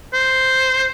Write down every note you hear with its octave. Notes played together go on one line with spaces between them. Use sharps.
C5